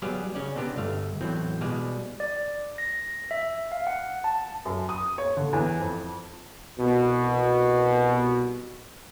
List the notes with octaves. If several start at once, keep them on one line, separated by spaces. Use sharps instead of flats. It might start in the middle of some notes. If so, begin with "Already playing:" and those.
F#3 G3 B3 G4 G#4 F5
C#3 C#4 D5
C3 B3 D4 G4
G1 A3 F5
E2 A2 F#3 C4
B2 G3 G#3 D5 F5
D5
A#6
E5
F5
F#5
A5
F#2
D#6
C#5
D3
E2
F2
C2 B2